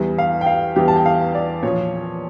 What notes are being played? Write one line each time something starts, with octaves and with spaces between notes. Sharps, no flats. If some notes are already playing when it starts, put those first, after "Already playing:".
Already playing: E2 E3 G3
F5
G5
F5
E2 E3 G3 G4
A5
G5
F5
D5
A#2 F3 C#5